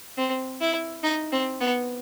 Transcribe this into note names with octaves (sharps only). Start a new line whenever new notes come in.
C4
E4
D#4
C4
B3